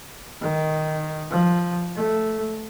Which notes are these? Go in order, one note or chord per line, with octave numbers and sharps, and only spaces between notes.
D#3
F3
A3